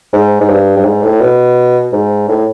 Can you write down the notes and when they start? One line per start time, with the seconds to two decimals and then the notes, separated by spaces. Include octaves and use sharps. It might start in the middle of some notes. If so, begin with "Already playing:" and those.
0.13 G#2
0.41 G#2
0.49 G2
0.77 G2
0.85 G#2
1.03 A2
1.21 B2
1.93 G#2
2.29 A2